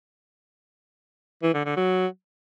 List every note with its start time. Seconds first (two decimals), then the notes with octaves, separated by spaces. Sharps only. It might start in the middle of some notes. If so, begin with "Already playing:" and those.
1.43 E3
1.54 D3
1.65 D3
1.77 F#3